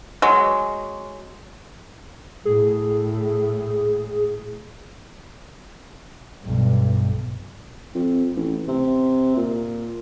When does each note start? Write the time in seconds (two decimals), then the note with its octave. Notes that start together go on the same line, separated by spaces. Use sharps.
0.22 F#3 G#3
2.45 A2 G#4
6.43 B1 G2
7.95 F2
8.37 A1
8.68 C3
9.37 A#2